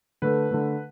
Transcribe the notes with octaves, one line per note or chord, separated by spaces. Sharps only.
D3 A3 B4
D3 A3